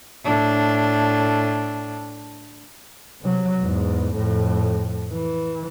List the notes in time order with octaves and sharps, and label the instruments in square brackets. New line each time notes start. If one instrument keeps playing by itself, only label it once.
[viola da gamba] A2 D4
[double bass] C3 F#3
E2 G#2
F2 A2
E3